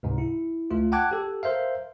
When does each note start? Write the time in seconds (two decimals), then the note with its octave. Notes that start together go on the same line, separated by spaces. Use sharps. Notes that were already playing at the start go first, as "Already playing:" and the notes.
0.03 C#2 G#2 C3
0.18 E4
0.71 C#2 A3 F4
0.92 F#5 G5 A5 D6 F#6 G#6
1.11 G4 A4
1.43 A#4 C5 E5 F5